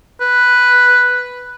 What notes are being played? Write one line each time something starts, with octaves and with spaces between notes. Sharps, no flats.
B4